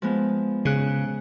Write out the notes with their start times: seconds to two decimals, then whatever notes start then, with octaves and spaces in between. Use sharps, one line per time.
0.02 F3 G#3 B3
0.65 C#3 G#4 F#6